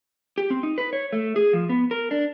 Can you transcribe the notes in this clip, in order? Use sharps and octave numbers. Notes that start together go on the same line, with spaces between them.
G4
C4
D#4
B4
C#5
A3
G#4
F3
B3
A#4
D4